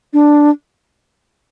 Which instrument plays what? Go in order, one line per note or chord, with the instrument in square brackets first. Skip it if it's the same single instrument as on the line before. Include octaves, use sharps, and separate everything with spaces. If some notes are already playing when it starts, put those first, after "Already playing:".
[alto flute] D4